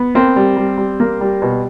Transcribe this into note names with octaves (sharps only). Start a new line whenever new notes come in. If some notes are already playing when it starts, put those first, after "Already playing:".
Already playing: B3
A#3 C4
G3
G3
G3
A#3
G3
B2